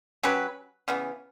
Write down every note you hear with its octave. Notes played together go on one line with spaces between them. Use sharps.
F#3 C#4 G4 B4
C#3 E3 B3